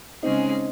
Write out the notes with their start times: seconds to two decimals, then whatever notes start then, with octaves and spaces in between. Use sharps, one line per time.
0.22 C#3 G#3 C4 C#4 D#4 G#4